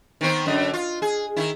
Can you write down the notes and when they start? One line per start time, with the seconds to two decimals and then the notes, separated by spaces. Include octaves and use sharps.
0.21 D#3 B3 C4
0.46 F#2 D3 D#5
0.74 F4
1.02 G#4
1.36 D#3 E4